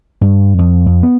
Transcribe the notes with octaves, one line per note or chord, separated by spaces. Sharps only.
G2
F2
F2
B3